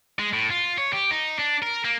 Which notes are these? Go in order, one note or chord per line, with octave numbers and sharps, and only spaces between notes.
G#3
A2
F4
C#5
G4
D#4
D4
A#4
A#3